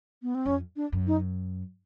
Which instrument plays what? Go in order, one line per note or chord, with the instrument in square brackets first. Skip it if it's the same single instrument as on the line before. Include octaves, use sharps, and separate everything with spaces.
[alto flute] B3
C4
[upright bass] F2 [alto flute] C#4
[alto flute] D4
[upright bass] F#2
[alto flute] D#4